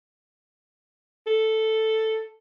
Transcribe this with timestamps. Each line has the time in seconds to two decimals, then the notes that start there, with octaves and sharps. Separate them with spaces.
1.27 A4